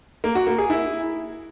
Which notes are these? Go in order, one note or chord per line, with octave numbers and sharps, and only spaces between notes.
A#3
F#4
A#3
G#4
E4